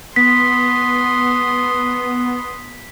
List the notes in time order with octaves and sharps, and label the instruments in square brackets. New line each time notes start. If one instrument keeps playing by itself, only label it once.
[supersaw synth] B3 [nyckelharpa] C6 D#6 [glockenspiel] B6